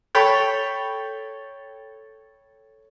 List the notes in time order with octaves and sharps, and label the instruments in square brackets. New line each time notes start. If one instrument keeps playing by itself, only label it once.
[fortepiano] A4 C#5 G5 B5